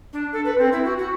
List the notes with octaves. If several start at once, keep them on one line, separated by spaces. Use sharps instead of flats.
D4
A4
B4
C4
E4
F#4
F#4